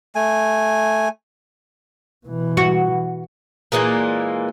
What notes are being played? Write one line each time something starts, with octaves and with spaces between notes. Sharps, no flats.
A3 G#5
B2 E3
F#4
A#2 E3 G#3 A#3